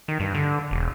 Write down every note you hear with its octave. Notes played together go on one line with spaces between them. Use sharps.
D#3
G2
D3
E1